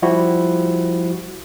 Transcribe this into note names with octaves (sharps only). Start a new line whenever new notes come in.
F3 G3 E4 F#4 G4